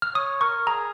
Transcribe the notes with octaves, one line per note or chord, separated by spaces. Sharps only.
F6
C#5 D#6
A#4 C#6
G#4 A#5